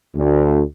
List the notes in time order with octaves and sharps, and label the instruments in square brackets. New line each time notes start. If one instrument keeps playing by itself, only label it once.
[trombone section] D2